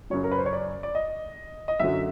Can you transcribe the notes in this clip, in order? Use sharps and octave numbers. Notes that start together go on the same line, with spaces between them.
F#2 C#3 F#3 C#5
A#4
B4
C5
C#5
D5
D5
D#5
D#5
F#2 D3 F#3 E5